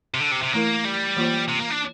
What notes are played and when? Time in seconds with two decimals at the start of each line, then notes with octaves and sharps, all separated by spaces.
0.14 C3
0.20 D3
0.31 C3
0.43 C3
0.52 E3 A3 A#3 E4 A#4
0.85 G3
1.16 E3 A#3 F4 C5
1.48 C3
1.60 A#3
1.70 D4